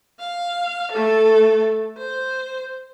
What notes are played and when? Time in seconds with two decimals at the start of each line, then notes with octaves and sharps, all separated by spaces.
0.19 F5
0.92 A3 A4
1.97 C5